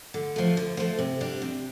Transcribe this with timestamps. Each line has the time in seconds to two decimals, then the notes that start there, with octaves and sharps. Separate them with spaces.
0.14 D3
0.36 F3 A3
0.57 D3
0.77 F3 A3
0.99 C3
1.20 G3 D4 G4
1.42 C3